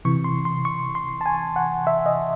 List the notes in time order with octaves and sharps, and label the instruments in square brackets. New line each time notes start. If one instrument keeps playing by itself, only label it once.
[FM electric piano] C3 E3 C#6
C6
C6
C#6
C6
A5
G#5
F#5
E5
D#5